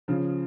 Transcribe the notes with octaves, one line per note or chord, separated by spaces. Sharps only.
C#3 F3